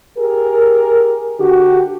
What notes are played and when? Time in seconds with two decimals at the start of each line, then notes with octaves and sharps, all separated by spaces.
0.18 G4 G#4 A#4
1.40 D3 F#4 G4